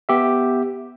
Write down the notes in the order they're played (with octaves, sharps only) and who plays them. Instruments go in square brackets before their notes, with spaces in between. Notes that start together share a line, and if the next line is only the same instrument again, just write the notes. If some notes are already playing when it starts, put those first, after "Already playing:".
[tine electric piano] B3 G4 E5